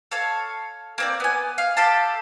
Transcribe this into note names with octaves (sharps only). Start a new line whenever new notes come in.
A4 C#5 F5
A#3 C4 D5
B3 G#5
F5
G4 A4 F5 A5